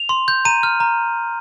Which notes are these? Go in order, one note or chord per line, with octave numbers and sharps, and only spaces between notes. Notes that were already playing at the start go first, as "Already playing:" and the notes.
Already playing: F7
C6
G6
A#5 D#7
F6
A#5